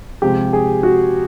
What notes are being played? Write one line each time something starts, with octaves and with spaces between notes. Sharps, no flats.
C3 F3 G#3 G4
G#4
F#4